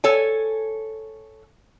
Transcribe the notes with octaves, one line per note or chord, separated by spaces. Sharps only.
A4 C#5 G#5